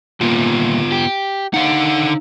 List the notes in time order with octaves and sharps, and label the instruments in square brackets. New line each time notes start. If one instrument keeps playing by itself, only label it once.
[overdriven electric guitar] D#2 A#2 [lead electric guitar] B3 F4
[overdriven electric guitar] G4
[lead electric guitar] D3 F#5 [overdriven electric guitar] D#4 F5